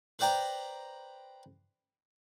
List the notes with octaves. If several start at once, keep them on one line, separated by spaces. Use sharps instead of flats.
B4 C5 D5 G5 A#5